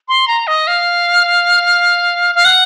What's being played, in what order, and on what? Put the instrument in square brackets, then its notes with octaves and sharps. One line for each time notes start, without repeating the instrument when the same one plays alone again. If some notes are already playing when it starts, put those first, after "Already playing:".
[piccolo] C6
A#5
D#5
F5
F5
F#5